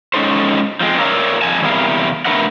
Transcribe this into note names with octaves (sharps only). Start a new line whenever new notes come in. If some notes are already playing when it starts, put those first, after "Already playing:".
G#3 C#4 D#4 A4 C5
F3 G#3 C4
A#4 C#5 D5 E5 F5 A#5
F2 G#3 G#5 A5
E2 C3 G3 E4 A#4 F5
A3 D4 A#4 B4 E5 F#5